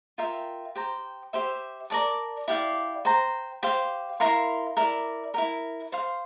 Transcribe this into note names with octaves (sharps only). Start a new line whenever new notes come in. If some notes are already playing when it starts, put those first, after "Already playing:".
F4 A#4 E5 G5
G4 C5 G5 A#5
G4 C5 E5
A#4 D5 A5 D6
E4 G4 D5 F5
C5 G5 A#5
G4 C5 F5
E4 A#4 F5 C6
E4 A#4 D5
E4 G4 A#4
C5 F5 C6